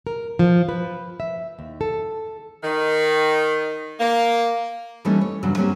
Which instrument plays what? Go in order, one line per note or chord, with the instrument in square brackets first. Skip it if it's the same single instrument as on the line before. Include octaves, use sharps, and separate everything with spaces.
[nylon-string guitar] A#4
F3
B4
E5
D#2
A4
[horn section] D#3
A#3
[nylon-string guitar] E3 G3 A3 A#3 C#4 D#4
C#5
E2 G2 C#3 F#3
F#3 G3 A#3 C4 C#4